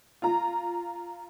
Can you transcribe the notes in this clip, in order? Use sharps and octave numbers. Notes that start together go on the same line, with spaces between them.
F4 A#5